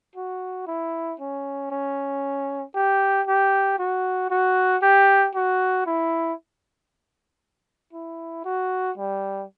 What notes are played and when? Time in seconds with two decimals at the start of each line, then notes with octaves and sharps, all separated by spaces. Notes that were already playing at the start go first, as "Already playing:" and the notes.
0.16 F#4
0.67 E4
1.20 C#4
1.71 C#4
2.75 G4
3.27 G4
3.79 F#4
4.30 F#4
4.82 G4
5.35 F#4
5.86 E4
7.93 E4
8.45 F#4
8.98 G3